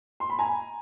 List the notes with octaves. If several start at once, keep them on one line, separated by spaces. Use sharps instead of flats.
C6
B5
G#5 A#5